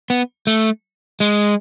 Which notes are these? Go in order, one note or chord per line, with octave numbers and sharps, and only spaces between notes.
B3
A3
G#3